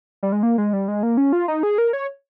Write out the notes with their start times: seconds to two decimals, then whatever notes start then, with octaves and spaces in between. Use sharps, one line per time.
0.23 G3
0.32 G#3
0.43 A#3
0.58 G#3
0.73 G3
0.88 G#3
1.03 A#3
1.17 C#4
1.33 F4
1.48 D#4
1.63 G#4
1.78 A#4
1.93 C#5